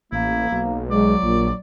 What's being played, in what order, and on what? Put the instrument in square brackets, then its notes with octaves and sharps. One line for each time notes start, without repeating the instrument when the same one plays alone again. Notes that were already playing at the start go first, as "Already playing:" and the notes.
[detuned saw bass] A1 [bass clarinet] A#3 [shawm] E4
[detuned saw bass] B1
[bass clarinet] F#3 [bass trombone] G#3 [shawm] D5
[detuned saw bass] A#1 [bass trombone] A#2